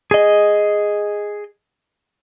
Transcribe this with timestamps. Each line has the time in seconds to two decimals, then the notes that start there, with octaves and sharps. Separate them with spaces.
0.11 G#4 D#5